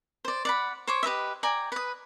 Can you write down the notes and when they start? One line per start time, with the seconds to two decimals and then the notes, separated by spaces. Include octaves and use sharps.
0.25 C5 D5
0.45 D5 F#5 B5
0.87 C5 C#5 D6
1.03 G4 B4 D#5 E5
1.43 D5 G5 G#5 A#5
1.72 B4 D#6